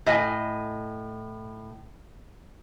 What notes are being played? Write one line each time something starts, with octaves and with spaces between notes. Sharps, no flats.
A2 D#5 G#5